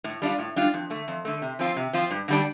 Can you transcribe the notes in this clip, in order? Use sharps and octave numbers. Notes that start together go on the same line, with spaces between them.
A2
G3 D4 F4
A2
G3 D4 F4
F2
D3 A3
F2
D3 A3
C3
F3 C4 F4
C3
F3 C4 F4
G2
D3 G3 D4